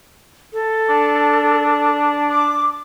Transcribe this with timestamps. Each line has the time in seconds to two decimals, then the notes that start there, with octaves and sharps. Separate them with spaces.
0.53 A4
0.89 D4
2.30 D6